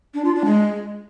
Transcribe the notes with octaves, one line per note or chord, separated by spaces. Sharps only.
D4
F4
D4
G#3